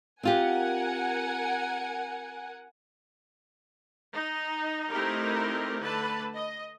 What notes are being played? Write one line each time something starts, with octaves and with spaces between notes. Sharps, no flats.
C4 F4 G4 A#4 F#5 G#5
D#4
A3 C4 D#4 E4 G4 A#4
D3 A3 B4 A5
D#5